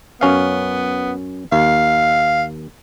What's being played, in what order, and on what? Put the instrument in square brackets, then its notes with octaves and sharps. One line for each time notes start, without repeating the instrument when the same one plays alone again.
[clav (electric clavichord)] F#2 C#4 F5 [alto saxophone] B3
[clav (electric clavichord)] D#2 [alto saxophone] F5